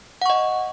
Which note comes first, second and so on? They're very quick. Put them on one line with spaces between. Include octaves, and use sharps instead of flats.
F#5 C#6 D#5